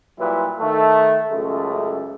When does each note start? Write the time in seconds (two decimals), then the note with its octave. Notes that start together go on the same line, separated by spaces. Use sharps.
0.19 A#2 F#3 G3 E4 B4
0.60 D#3 A3
1.30 C#2 F#2 G#3 A3